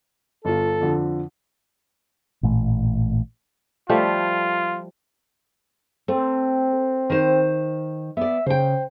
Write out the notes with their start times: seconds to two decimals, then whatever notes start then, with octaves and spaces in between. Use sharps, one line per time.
0.45 G1 F4 A4
0.81 F2 D3 F3
2.43 A1 A#2 A3
3.89 F3 G3 A3 F4
6.08 A3 C4
7.10 D#3 C5
8.17 B3 D5 E5
8.46 C#3 C5 G5